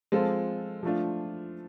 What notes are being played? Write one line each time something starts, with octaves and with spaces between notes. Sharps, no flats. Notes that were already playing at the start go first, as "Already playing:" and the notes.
F3 G#3 C4 F4 A4
F3 A3 D4 F4